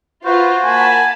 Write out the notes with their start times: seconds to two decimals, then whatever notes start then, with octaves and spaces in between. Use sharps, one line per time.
0.25 F4 F#4 B4 C5 F#5
0.64 A#3 G#5 A5 B5